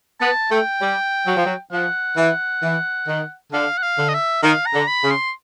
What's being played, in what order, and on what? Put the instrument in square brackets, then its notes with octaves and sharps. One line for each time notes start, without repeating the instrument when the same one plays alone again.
[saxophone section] B3 [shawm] A5
[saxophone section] A3 [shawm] G5
[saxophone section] G3
F#3
F3
F#3
[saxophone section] F3 [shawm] F#5
[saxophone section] E3
E3
D#3
[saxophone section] D3 [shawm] F5
[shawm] F#5
F5
[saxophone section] D3
[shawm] D#5
E5
[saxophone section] D#3 [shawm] F5
[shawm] A#5
[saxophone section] D3
[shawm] B5
[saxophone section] C#3
[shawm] C6